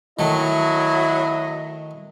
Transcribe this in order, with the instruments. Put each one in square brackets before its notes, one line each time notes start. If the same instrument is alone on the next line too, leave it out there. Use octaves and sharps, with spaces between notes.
[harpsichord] D#3 A3 [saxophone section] F#3 [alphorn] E4 [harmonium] D#5